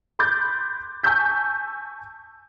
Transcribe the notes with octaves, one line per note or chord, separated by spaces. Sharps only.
B5 C6 D6 F#6 G6 A6
G#5 A5 C#6 E6 G6 B6